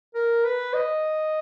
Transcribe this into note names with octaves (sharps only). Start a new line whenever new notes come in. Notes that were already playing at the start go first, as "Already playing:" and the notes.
A#4
B4
D#5